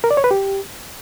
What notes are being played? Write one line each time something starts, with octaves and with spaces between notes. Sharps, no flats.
A#4
D5
C#5
B4
G4